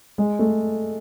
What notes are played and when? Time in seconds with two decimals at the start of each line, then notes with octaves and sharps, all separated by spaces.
0.18 G#3
0.39 A3